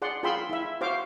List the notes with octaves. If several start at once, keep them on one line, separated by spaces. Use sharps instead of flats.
G#4 D5 F#5 C6
F4 G#4 G5 B5 C6 E6
E4 E5
F#4 C5 F5 D6